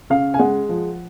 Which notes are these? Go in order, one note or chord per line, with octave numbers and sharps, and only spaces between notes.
C#3 F5
G#5
G#3 F#5
F3